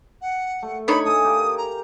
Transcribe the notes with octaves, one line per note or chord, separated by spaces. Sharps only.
F#5
A3
D4 D#4 C#5 B5
A3 A4 G#5 D#6
G4 A#4 F5
A#5